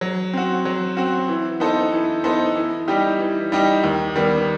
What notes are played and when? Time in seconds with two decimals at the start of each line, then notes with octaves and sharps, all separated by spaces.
0.01 F#3
0.33 C4 F#4
0.65 F#3
0.97 C4 F#4
1.28 E3
1.60 B3 D#4 A4 C5
1.92 E3
2.24 B3 D#4 A4 C5
2.56 E3
2.88 G3 D#4 G4
3.20 E3
3.52 G3 D#4 G4
3.84 D#2
4.16 D#3 G3 B3